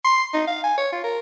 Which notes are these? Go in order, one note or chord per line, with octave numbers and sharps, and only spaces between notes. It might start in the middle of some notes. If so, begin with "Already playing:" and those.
C6
D#4
F5
G#5
C#5
F4
A#4